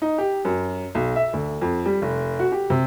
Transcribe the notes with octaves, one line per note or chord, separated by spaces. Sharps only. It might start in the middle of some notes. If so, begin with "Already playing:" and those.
D#4
G4
F#2
B1
E5
D2
F2
G3
F1
F#4
G4
C3